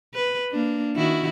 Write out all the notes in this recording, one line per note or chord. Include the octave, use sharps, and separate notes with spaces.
B4
A#3 D4
D#3 E4 F#4